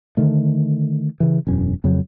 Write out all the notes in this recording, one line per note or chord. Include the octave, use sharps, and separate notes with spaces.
D3 D#3 A3
C#3 E3
E1 F#2 C#4
F2 C#3 F#3